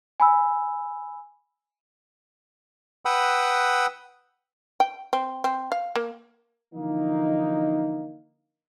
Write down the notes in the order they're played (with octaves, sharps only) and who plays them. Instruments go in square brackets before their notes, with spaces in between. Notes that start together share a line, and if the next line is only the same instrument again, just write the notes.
[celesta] G#5 B5 E6
[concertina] B4 F#5 G5 B5 D#6 E6
[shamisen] G5
C4
C4
F5
A#3
[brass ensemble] D3 E3 F3 A#3 D#4